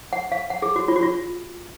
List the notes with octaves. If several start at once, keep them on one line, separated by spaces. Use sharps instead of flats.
F#5
F5
F#5
G#4
F#4
F4
F#4
F4